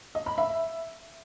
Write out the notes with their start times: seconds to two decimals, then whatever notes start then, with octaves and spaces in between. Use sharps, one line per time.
0.15 D#5
0.26 B5
0.38 E5